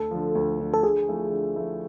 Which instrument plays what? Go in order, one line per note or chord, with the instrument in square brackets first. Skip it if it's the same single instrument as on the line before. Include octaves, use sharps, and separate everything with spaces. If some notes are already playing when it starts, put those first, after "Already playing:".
Already playing: [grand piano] D2 [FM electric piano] A4
[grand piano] D3 F3
D2
D3 F3
[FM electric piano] A4
[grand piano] D3 [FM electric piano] G#4
[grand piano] F3 A3 E4
D3
F3 A3 E4